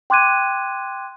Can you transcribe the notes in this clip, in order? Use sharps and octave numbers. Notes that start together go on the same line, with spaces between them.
G5 C6 D6 F#6 G#6 D#7